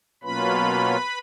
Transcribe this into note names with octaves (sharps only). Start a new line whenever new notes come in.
B2 F#3 A#3 C#4 F4 B4 B5